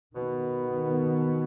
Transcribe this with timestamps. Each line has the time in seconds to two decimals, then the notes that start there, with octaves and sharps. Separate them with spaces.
0.15 B2 D#3 B3